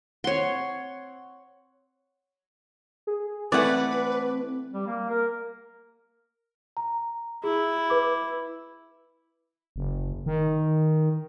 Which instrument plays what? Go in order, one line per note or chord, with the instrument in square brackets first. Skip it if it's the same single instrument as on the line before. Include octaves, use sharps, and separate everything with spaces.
[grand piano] C4 F#5 [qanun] C#5 C6
[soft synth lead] G#4
[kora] E3 A3 [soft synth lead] C4 [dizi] B4 [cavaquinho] D5 F#5
[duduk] G3
A#3
A#4
[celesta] A#5
[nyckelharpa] E4 [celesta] G#4
[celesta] B4 D6
[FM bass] F#1
D#3